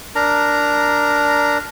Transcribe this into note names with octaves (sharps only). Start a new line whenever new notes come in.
D4 A#4 A#5